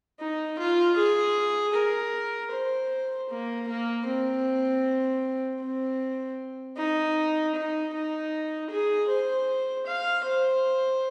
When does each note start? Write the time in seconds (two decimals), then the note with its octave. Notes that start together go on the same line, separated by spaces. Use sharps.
0.20 D#4
0.59 F4
0.96 G#4
1.74 A#4
2.51 C5
3.30 A#3
3.68 A#3
4.06 C4
5.60 C4
6.77 D#4
7.55 D#4
7.93 D#4
8.70 G#4
9.08 C5
9.87 F5
10.24 C5